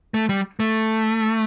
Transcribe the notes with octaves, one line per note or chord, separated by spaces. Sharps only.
A3
G3
A3